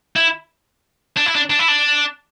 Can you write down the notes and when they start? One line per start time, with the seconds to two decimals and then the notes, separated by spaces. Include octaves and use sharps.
0.16 E4
1.17 D4
1.26 E4
1.35 D4
1.50 D4
1.59 E4
1.68 D4